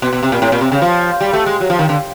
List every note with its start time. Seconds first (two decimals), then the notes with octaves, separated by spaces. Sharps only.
0.02 B2
0.13 B2
0.23 C3
0.32 A#2
0.42 A2
0.52 A#2
0.61 C3
0.72 C#3
0.82 F3
1.21 G3
1.33 A3
1.46 G#3
1.60 F#3
1.70 F3
1.79 D#3
1.89 D3